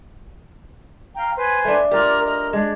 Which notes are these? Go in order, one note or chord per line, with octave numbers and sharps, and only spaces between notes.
F5 G5 A#5
B4 C5 G#5
A3 D4
F4 G4 A#4 D5
A#4 D#5
G#3 D4